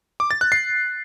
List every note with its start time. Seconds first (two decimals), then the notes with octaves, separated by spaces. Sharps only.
0.20 D6
0.31 A6
0.41 F#6
0.52 C7